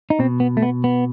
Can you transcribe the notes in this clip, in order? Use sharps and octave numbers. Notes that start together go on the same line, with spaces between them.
D#4
B2 C4
B3
A3
B3
B3